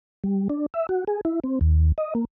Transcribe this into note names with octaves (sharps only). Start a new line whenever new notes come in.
G3
D4
E5
F#4
G#4
E4
C4
D#2
D#5
A#3